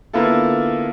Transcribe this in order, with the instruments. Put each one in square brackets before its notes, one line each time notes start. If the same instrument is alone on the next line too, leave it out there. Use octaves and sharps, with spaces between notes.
[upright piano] D3 A#3 B3 E4 F4 A4